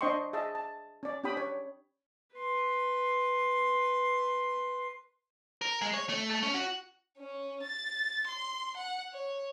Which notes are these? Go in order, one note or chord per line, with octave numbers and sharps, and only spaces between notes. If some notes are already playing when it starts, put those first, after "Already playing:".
D4 C5 D#5 G5 C6 C#6
G#4 D#5 E5 A5
A5
C#4 D5
C#4 D4 G4 G5 B5 D#6
C#5
B4 C6
A#4
G#3
C#5
A3
A3
C#4
F#4
C#4
A6
C6
F#5
C#5